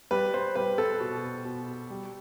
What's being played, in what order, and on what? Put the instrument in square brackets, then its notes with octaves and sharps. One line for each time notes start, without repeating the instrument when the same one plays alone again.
[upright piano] G3 B4
C5
G3 B4
A4
B2
B2
G3